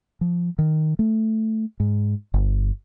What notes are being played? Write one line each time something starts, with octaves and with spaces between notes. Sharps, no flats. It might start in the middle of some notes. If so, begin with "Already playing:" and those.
F3
D#3
A3
G#2
G1